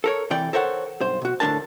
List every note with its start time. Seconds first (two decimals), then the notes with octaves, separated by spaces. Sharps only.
0.04 A4 A#4 C#5
0.30 C3 E3 D5 G5
0.53 A4 A#4 C5 C#5 D#5 F#5
1.01 B1 G2 C5
1.22 B2 F#4
1.40 A2 D3 A#3 D4 A#4 A5